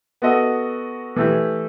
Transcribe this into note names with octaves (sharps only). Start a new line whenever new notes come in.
B3 F#4 A4 D#5
E3 A3 E4 G4